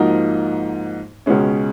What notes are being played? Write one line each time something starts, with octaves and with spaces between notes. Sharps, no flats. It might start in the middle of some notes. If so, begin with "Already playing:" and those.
Already playing: G#2 F3 A#3 D#4 F#4
C#2 B2 G#3 C#4